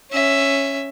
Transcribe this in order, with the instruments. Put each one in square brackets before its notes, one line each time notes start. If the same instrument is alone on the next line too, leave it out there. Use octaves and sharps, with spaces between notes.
[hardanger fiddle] C#4 E5